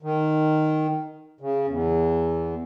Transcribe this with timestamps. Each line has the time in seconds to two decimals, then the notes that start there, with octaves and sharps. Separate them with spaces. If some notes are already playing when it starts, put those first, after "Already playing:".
0.02 D#3
1.41 C#3
1.68 E2